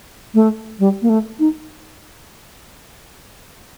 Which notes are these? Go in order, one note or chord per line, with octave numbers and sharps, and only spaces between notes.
A3
G3
A#3
A3
D#4